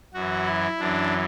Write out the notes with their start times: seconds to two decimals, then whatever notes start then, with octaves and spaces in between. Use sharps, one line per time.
0.14 F#2 E3 F#4
0.46 E4
0.79 F#2 E3 D4